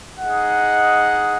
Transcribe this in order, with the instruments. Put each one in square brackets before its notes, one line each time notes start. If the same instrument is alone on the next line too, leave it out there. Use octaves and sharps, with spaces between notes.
[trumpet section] D#4 G#4 D#5 F#5